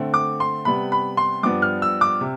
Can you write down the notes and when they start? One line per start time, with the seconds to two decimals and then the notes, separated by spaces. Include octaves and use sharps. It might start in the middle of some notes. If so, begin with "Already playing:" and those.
Already playing: D3 A3 C4
0.14 D6
0.40 C6
0.65 C3 G3 B3 B5
0.92 B5
1.17 C6
1.43 G2 F3 B3 D4 D6
1.62 F6
1.82 E6
2.01 D6
2.21 C3